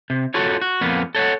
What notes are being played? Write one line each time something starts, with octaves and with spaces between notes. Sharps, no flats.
C3
F4 F#4 A4 C#5
F#4
F2 A#3 B3
A4 C#5 F5 F#5